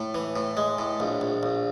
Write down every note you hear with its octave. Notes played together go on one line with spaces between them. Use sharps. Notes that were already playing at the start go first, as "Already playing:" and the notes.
Already playing: A2
E3
A2
G#3
A2
A#1
A#1
A#1